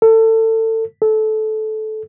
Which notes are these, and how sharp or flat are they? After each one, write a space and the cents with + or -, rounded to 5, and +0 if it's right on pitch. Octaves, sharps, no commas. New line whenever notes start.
A4 +25
A4 -20